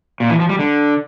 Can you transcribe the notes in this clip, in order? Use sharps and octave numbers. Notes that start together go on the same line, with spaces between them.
A#2
E3
F3
G3
D3